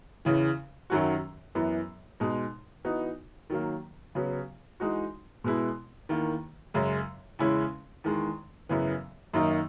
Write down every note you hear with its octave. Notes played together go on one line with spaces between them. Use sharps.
E2 C#3 E3
F#2 D#3 F#3 C#4 F#4
F#2 E3 B3
B2 G#3 D#4
E3 B3 D#4 F#4
D#3 F#3 A#3
C#3 F#3 B3
E3 G#3 D#4 F#4
B2 G#3 B3 E4
E2 D#3 A#3
F#2 C#3 G#3
E2 C#3 G#3 C#4 E4
E2 D#3 G#3
F#2 C#3 E3 B3
F#2 D#3 A#3 D#4